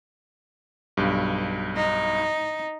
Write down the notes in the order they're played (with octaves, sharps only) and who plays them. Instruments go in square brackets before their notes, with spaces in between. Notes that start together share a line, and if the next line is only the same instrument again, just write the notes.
[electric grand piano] B1 G2
[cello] D#4